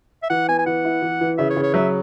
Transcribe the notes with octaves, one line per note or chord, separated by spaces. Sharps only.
E5
E3 F#5
B3 G#5
G#5
E3 F#5
E4
E3
E3
C#3 E5
C#5
C#3
C#5
F#3 E5